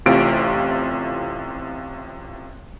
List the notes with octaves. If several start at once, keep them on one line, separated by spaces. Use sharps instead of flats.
A1 A2 C3 F4 D7